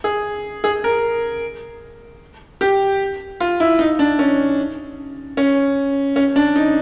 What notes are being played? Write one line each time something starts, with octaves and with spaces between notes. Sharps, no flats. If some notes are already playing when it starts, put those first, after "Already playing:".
G#4
G#4
A#4
G4
F4
E4
D#4
D4
C#4
C#4
C#4
D4
D#4